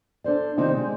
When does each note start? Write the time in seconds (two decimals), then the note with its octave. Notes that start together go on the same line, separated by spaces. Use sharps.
0.24 D4 A4 C5 D5
0.57 C3 D#3 C4 D4 D#4 F4
0.76 G#3